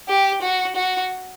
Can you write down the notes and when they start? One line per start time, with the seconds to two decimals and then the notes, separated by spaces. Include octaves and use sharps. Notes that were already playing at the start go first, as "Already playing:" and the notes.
0.08 G4
0.42 F#4
0.76 F#4